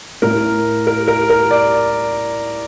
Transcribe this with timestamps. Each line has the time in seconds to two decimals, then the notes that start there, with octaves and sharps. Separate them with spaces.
0.22 A2 A#4
0.87 A#4
1.08 A#4
1.30 A#4
1.51 D5